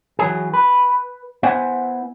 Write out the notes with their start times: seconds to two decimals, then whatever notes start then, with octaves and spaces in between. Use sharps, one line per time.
0.19 E3 F#3 G#4
0.53 B4
1.43 B3 E4 C5 F#5 G#5